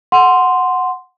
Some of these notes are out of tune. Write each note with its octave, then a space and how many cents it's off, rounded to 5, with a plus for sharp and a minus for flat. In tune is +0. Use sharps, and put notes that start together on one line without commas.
F#5 -5 C6 -5